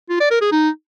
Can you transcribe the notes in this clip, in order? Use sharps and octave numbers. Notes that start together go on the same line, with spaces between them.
F4
D5
A#4
G#4
D#4